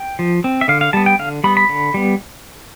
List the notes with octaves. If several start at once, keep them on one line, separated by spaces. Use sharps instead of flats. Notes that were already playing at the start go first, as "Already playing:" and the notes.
Already playing: G5
F3
C4
E5
D3 F5
F5
G3 B3 A5
G5
D3 F5
G3 B3 B5
B5
D3
G3 B3